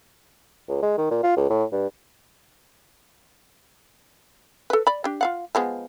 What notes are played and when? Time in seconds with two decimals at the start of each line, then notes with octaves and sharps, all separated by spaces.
0.69 C#2
0.82 G#3
0.98 D#3
1.11 A#2
1.23 F4
1.37 C#2
1.50 A2
1.72 G2
4.70 A4 B4
4.87 D5 B5
5.04 D4 G4
5.21 F4 F5 F#5
5.55 F3 G#3 B3